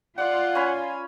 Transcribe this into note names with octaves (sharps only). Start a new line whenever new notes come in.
F4 D5 F#5
C#4 G#5 B5